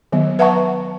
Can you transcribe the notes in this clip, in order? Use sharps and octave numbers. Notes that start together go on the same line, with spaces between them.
D#3 F#3 B3
B4 E5 F#5 A5 A#5 C#6